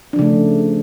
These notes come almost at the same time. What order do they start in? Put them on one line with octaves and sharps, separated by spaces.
D4 F3 C#3 A3